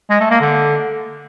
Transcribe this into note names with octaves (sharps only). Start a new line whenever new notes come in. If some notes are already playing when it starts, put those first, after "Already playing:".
G#3
A3
A#3
D3